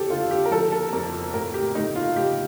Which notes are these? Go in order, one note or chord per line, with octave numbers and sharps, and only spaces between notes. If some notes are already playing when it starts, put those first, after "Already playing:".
Already playing: F2 G4 A4
D3 F4
G4
A#4
F3 A4
A4
F2 A#4
A2 A#4
G4
A3 D#4
F4
A2 G4